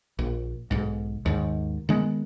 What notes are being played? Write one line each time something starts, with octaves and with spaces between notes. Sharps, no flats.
A#1
B1 G#2
D#2 G#2 D#3
D#3 G#3 B3